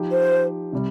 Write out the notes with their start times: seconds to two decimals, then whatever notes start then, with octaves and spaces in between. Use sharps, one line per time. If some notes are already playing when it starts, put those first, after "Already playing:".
Already playing: F3 D#4 G4
0.12 C5
0.73 C3 G3